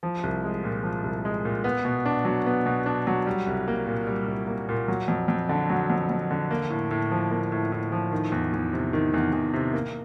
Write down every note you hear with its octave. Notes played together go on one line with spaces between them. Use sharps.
F3
C2
G#3
A#2
F3
C2
G#3
A#2
B3
B2
D4
F#3
B3
B2
D4
F#3
G3
C2
A#3
A#2
G3
C2
A#3
A#2
F#3
F2
F2
D3
F#3
F2
F2
D3
A#3
A2
A2
F3
A#3
A2
A2
F3
D#3
E2
E2
C3
D#3
E2
E2
C3
A#3